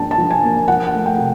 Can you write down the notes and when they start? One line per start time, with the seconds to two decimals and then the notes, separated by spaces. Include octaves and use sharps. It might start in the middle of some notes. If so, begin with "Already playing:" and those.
Already playing: G#2 F3 A#3 D4 G5 A5
0.11 A5
0.18 F3
0.31 G#5
0.43 A#3
0.68 F3 F#5
0.87 F#5
0.93 A3
1.06 G5
1.18 C3